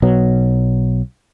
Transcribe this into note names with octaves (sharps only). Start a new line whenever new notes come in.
B1 B2 F#3